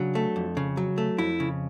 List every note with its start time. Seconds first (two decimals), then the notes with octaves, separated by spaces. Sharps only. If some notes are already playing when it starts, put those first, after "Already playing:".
Already playing: C#3 F#3 D4
0.15 A3
0.36 F2
0.57 C#3
0.77 F#3
0.98 A3
1.18 F2 E4
1.40 C#3